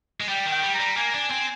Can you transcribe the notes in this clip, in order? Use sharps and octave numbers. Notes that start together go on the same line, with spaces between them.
G#3
G3 G5
D#3
G5
G3
A#5
G3
A#3 G#5
D4
C4